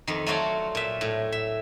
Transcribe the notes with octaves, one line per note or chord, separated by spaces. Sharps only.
F2 D#3
F#3 A3 F4 F#4 C#5 D5
A#2 E5
A2
E5